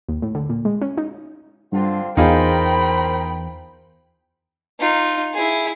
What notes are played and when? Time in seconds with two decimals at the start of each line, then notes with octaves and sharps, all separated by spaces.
0.08 D#2
0.22 A2
0.35 D3
0.49 A#2
0.65 G#3
0.82 C#4
0.97 D#4
1.72 G2 D3 C4 F4
2.17 E2 D#4 F4 G#4 A#4 C5 G5 B5
4.80 D#4 F4
5.34 E4 G#4